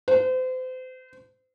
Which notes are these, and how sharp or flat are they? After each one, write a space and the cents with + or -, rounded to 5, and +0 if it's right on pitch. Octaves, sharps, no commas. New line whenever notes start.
C5 -35